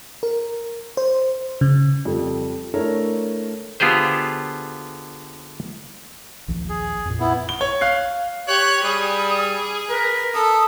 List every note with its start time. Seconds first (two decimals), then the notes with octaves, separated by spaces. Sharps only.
0.23 A#4
0.97 C5
1.61 C#3
2.05 F2 G3 A4
2.74 A3 D4 E4 A4 A#4 C#5
3.80 D3 B3 F4 G4 G#4 C5
6.48 A#1 D#2 F3
6.69 G#4
7.05 F2 A#2
7.20 B3 E4
7.49 G7
7.61 C#5
7.81 F5 F#6 C7
8.48 G4 C#5 F#6
8.84 G3 G#4 D#6
9.90 A#4 B4
10.34 A4 D#6